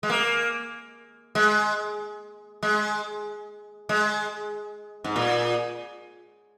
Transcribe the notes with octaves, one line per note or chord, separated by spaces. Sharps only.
G#3
A#3
G#3
G#3
G#3
G#2
A#2